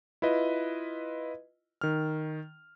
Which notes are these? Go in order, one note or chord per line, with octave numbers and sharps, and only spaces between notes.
E4 F4 B4 D#5
D#3 F6